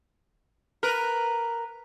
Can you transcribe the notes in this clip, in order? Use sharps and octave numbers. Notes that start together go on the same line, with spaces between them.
A#4 B4